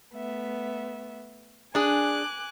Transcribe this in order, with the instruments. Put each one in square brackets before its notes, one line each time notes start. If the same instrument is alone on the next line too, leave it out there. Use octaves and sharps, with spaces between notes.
[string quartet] A3 B3 E5
[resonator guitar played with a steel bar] D4 G#4 [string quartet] G#5 D6 F#6